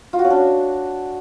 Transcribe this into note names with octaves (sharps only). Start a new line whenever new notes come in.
F4
F#4
C#4
D4